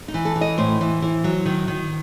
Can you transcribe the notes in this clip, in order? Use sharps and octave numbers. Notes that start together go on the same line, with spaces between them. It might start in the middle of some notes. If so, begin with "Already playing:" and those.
D#4
E3
A4
E3
D#5
A2 C5
E3
E3
F#3
D#3
D#3